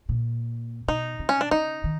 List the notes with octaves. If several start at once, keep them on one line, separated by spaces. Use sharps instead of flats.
A#2
B2 D#4
C3
C#4
D4
C#3 D#4
D#3